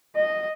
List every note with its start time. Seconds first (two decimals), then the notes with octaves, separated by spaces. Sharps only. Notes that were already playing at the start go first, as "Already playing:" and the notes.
0.15 D#5